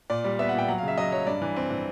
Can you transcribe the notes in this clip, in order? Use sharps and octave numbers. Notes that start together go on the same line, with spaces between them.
A#2 D5
G3
B3 E5
F#5
A#2 G5
F#3 F#5
F5
C#3 E5
F#3 D#5
F#3 C#5
G2 D5
E3
C4
E3